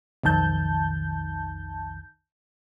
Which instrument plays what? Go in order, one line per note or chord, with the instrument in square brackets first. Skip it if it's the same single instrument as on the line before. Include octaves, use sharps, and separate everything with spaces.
[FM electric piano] B1 F2 D#3 A5 G6